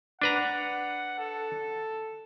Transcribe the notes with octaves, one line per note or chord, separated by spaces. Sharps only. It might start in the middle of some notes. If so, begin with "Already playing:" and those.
D4 B4 F#5 A#5
A4